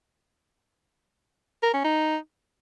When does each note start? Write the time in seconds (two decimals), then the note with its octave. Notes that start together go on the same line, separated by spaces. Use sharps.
1.63 A#4
1.74 C#4
1.84 D#4